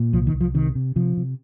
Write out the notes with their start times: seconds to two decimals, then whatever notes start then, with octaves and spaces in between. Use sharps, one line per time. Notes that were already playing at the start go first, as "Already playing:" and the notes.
Already playing: A#2
0.13 C2 F3
0.27 D#3
0.34 C2
0.41 F3
0.54 C3 D#3
0.75 C3
0.96 C3 F3
1.17 C3